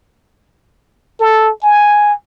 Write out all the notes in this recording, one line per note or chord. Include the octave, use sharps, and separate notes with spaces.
A4
G#5